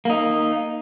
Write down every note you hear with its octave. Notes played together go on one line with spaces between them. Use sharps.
A#3 D#4